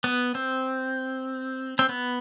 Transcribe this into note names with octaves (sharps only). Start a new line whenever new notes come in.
B3
C4
C4
B3